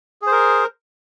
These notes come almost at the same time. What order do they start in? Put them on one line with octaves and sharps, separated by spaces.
G#4 C5 A#4